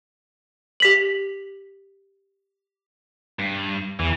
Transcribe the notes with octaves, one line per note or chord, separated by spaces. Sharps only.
G4 B6 F#7
G2
E2 E3